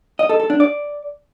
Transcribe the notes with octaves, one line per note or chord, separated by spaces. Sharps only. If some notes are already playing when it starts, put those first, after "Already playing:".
D#5
A4
A4
D4
D5